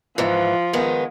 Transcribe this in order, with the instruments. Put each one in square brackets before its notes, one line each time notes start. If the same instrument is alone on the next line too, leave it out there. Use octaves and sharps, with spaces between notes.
[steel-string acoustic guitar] G#2 E3 [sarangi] F3
[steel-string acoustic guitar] D#3 G#3 B3